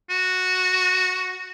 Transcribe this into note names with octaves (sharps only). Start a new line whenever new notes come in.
F#4